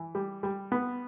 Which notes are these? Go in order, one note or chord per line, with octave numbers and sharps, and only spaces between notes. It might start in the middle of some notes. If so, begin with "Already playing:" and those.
Already playing: E3
G3
G3
B3